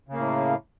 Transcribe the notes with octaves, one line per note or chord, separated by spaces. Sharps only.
A2 C#3 A#3